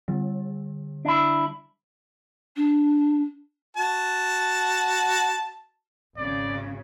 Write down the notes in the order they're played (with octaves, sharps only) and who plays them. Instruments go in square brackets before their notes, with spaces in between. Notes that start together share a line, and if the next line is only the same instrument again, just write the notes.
[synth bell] D3 G3
[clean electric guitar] D4 E4
[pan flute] D4
[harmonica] F#4 A5
[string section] G#1 C#3 [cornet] D5